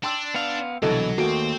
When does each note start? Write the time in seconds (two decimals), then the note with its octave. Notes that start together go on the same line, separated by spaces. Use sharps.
0.03 D4 G5 C6 E6
0.34 B3 F5
0.83 C2 B2 D3 E3 F#3 A4 D#5
1.18 D#2 A3 A#3 F#4 C5 G5